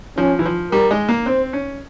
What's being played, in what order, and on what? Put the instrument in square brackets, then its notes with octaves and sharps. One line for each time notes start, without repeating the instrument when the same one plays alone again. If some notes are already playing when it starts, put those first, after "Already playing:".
[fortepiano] F3 [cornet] C#4
[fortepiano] E3
F3
[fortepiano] G3 [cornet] A#4
[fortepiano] G#3
A#3
[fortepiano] C4 [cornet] C5
[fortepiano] C#4